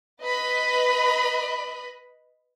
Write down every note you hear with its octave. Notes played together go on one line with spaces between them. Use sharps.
B4 D#5 B5